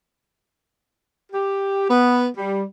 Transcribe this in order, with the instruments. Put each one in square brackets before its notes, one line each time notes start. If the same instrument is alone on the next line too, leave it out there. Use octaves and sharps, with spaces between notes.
[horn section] G4
B3
G3